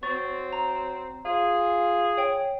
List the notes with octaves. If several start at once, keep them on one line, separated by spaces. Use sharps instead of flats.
F#3 C4 C#6 A6
A#5
F4 G#4
C#5 G5